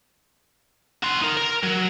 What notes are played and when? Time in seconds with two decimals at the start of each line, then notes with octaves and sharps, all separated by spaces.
1.03 F#4 C6
1.22 D#4 A#4
1.37 A#4
1.63 F#3